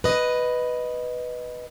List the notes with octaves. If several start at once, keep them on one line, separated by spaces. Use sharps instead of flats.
B4 D#5